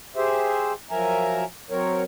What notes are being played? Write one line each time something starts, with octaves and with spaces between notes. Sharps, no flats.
G4 G#4 C5 E5
F3 F#3 A#4 E5 G#5 A#5
F#3 C4 A#4 C#5